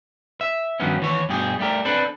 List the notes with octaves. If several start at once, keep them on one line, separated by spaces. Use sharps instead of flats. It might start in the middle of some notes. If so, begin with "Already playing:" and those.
E5
G2 D#3 F3 F#3 B3 C#4
D#2 E3 C#5
G2 B2 G4 G#4
G3 A3 G4 A#4
C4 D4 A4 B4